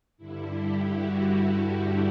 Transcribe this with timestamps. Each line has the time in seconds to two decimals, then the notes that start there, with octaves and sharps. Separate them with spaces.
0.17 G2 D3 G3 E4
0.53 G4
0.88 F#4